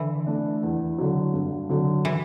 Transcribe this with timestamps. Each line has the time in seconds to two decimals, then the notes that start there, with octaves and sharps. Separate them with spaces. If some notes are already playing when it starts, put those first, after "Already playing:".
Already playing: D3 E3
0.26 A3 D4
0.63 E2
0.98 D3 F#3
1.33 G2
1.69 D3 F#3
2.05 E3